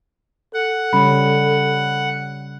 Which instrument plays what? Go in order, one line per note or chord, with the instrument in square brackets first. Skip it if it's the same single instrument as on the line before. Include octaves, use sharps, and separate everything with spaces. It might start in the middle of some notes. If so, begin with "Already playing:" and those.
[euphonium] A4 [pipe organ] F#5
[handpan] C#3 G3 C#4 [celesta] B5